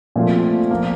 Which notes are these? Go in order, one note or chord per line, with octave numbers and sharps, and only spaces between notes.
A#2 F3 A3 C4 F4
F3 A#3